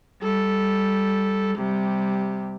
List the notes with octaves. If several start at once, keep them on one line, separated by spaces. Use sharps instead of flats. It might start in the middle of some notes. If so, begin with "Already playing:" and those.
G3 A4
C3 G3